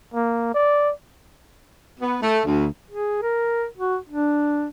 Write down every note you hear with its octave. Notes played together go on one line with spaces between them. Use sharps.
A#3
D5
B3
A3
D2
G#4
A#4
F#4
D4